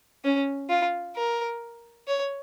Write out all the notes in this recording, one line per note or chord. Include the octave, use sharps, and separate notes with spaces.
C#4
F4
A#4
C#5